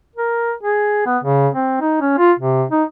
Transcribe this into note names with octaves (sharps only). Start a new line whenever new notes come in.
A#4
G#4
B3
C#3
C4
D#4
C#4
F4
C3
D#4